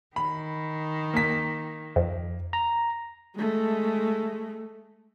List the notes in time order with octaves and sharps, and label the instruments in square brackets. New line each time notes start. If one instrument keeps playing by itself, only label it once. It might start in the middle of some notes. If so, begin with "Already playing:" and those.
[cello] D#3 [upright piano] B5
[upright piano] A#3 B6
[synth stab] F2
[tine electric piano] A#5
[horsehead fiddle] G#3 A3